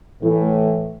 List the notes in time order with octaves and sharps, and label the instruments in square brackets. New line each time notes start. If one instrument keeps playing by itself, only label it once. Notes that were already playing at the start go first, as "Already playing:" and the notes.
[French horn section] A2 E3 A3